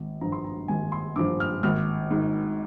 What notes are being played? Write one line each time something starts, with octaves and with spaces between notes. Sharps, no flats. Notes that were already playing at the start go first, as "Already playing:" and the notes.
Already playing: G#1
G2 F3 A#5
C6
A#5
G#1 G#5
C6
G2 F3 D6
F6
G#1 F6
G#2 D#3